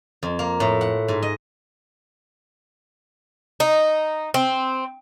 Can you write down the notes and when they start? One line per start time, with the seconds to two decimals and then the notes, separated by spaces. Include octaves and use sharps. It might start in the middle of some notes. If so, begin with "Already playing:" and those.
0.23 F2
0.39 A#3
0.60 A2
0.81 F#5
1.08 G#2
1.22 D#5
3.60 D#4
4.34 C4